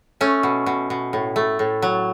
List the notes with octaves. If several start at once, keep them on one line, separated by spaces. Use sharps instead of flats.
A3 C#4
B2
B2
B2
A2
A3
A2
F#3